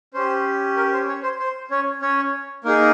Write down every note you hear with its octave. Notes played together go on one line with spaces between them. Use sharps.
C#4 G4 C5
A#4
C5
C#4 C#5
C5
C5
C#4 C#5
C#4 C#5
A#3 D#4 G#4 A#4